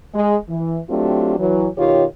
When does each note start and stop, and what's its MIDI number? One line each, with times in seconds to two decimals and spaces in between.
0.14 0.36 56
0.48 0.79 52
0.89 1.39 54
0.89 1.39 57
0.89 1.39 60
0.89 1.39 62
0.89 1.39 65
0.89 1.39 67
1.39 1.68 52
1.39 1.68 54
1.78 2.04 47
1.78 2.04 51
1.78 2.04 65
1.78 2.04 67
1.78 2.04 73